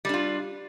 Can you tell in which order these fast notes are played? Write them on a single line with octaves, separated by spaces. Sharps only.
G3 D4 F4